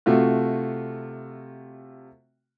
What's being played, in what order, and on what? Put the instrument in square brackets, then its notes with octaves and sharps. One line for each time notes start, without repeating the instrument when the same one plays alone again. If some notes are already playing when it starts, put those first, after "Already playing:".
[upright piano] C3 A3 F4 F#4